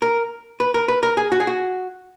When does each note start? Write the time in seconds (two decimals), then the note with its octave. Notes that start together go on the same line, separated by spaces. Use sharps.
0.02 A#4
0.60 B4
0.74 A#4
0.88 B4
1.03 A#4
1.17 G#4
1.32 F#4
1.40 G#4
1.47 F#4